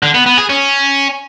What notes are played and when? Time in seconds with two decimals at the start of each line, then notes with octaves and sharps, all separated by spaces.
0.03 D3
0.14 B3
0.26 B3
0.38 G#4
0.50 C#4